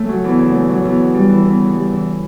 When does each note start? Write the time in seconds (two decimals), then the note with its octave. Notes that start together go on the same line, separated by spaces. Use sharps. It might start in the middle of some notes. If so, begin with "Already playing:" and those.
Already playing: C#3 A3
0.09 F#3
0.24 E2
0.38 C#3
0.54 A3
0.69 F#3
0.84 E2
1.00 C#3
1.14 G3
1.29 E3
1.45 E2
1.60 C#3
1.75 G3
1.90 E3